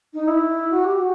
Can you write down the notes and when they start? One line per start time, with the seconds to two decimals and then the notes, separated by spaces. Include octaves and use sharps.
0.14 D#4
0.27 E4
0.70 F#4
0.84 G4
0.98 F#4